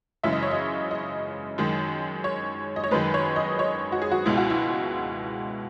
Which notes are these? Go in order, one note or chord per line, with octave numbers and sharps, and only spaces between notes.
F#2 C#3 E3 G#3 E5
D#5
C#5
D#5
D#5
F#2 D#3 G#3
C#5
D#5
C#5
F#2 D#3 G#3 B4
C#5
D#5
C#5
F#4
G#4
F#4
C#2 B2 G#3 E4
F#4
E4